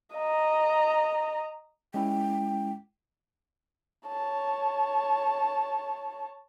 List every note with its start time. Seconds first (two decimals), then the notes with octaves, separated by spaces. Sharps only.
0.16 D#5 A#5
1.94 G#3 C#4 E4 G5
4.08 C#5 A5